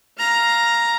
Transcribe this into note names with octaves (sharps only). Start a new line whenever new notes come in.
F5 A#5